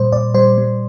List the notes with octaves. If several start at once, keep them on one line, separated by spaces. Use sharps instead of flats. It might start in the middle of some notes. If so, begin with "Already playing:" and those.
Already playing: A#2 G3 C5
A#2 D5
G3 C5
G3